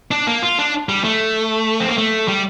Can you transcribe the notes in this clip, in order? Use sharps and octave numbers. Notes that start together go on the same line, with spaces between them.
D4
A#3
F4
D4
G3
A3
C4
A#3
A3
G3